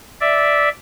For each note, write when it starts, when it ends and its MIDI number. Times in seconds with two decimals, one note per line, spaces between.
0.21 0.69 74
0.21 0.69 76